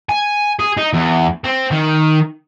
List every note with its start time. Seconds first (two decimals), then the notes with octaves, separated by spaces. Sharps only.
0.09 G#5
0.59 G#4
0.77 D#4
0.93 E2
1.44 C4
1.71 D#3